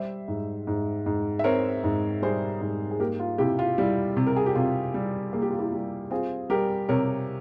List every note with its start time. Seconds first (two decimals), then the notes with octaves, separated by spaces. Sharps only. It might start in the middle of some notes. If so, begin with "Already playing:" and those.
Already playing: G3 C5 E5
0.28 G#2
0.67 G#2
1.06 G#2
1.39 E5
1.44 C4 A#4 C#5
1.84 G#2
2.22 G3 G#4 C5
2.61 G#2
2.91 G#4
3.00 A#3 G4 A#4
3.20 F4
3.38 C3 E4 G4
3.59 F4
3.78 G3 E4
4.17 C3
4.27 A#4
4.36 G#4
4.46 G4
4.55 C3 F4
4.94 G3
5.33 A#3 G#4
5.42 G4
5.50 F4
5.59 E4 G4
5.73 G3
6.11 C4 F4 G#4
6.50 G3 G4 A#4
6.89 C3 A#4 C#5